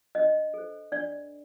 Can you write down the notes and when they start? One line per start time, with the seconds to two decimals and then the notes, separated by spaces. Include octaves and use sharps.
0.15 D4 D#5
0.54 A4 C5
0.92 D4 D5